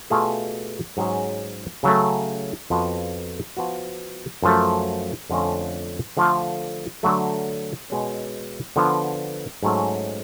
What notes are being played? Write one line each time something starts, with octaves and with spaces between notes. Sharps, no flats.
B2 A3 F4 G#4
G#2 F#3 C#4 G#4
C#3 F#3 A3
F2 F3 B3 F#4
F3 B3 F#4
F#2 F3 A3
F2 D3 F3 A3 C#4
D3 F3 A3 D4 F4
D3 F#3 A3
B2 G#3 C#4
D3 F3 B3
G#2 F#3 A3 C#4